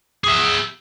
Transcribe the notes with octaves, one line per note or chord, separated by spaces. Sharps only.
G#4 E5